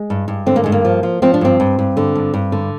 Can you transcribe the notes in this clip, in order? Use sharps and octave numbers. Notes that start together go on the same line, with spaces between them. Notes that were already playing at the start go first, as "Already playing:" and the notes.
Already playing: G#3
G2
G2
D3 C4
A#3
G2 G#3
A#3
F3
F3
F3 C4
D4
G2 C4
G2
G2
D3
G2
G2
D3